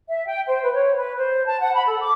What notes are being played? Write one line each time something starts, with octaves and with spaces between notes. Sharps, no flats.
E5
G5
C5
B4
C#5
B4
C5
A5
F#5
B5
A4
D6